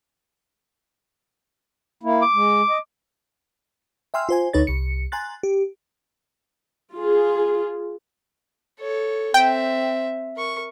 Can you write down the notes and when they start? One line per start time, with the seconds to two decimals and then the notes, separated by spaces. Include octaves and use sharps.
2.03 A#3 E4
2.22 D6
2.34 G#3
2.69 D#5
4.14 E5 G5 G#5 C6 E6 F6
4.29 F4 C5 G#5
4.53 D2 D#4 B4 C#5 A6
4.67 C2 C#7
5.12 G#5 A#5 C6 F#6 A6
5.43 G4
6.94 F4 G#4
8.80 A4 C#5
9.34 C4 E5 G5
10.37 A#4 C#6